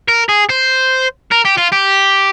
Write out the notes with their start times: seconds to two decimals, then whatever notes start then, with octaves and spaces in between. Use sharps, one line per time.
0.08 A#4
0.29 G#4
0.49 C5
1.32 A#4
1.45 G4
1.58 F4
1.73 G4